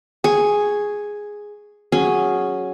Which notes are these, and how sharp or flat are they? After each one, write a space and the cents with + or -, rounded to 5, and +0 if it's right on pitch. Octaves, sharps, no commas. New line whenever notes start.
G#4 +0 C#6 +0
F#3 +0 C#4 +0 G#4 +0